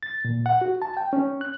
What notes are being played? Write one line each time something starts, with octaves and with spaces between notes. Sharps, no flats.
A6
A#2
F#5
F#4
A5
G5
C#4
F#6